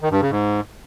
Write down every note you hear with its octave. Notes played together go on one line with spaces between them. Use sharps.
D#3
G2
C#3
G#2